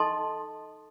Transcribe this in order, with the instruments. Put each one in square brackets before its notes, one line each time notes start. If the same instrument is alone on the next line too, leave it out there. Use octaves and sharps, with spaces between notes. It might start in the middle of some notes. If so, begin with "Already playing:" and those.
Already playing: [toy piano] D#4 A4 D#5 A5 C6